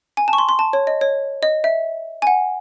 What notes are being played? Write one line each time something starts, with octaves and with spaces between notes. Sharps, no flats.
G#5
A5
C#6
C6
C6
A5
C#5
D#5
C#5
D#5
E5
G#5
F#5